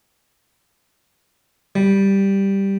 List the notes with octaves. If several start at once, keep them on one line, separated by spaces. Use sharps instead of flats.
G3